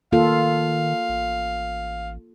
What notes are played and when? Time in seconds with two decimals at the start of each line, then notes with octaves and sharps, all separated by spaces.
0.12 D#3 A#3 F4 A4 F5
1.09 A1